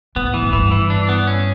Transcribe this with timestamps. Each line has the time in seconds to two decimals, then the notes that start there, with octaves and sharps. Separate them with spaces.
0.16 A2 B3
0.34 E3
0.43 F#2
0.53 G2 E3
0.72 E3
0.90 D4
1.09 B3
1.27 C#4